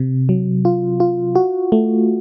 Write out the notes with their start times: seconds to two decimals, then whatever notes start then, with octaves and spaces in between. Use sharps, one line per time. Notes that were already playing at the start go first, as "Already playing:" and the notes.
Already playing: C3
0.29 F#3
0.65 F4
1.00 F4
1.35 F#4
1.72 A3